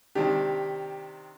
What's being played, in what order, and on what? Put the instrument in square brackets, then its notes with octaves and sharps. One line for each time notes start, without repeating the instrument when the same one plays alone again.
[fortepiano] C3 D#3 D4 [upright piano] G4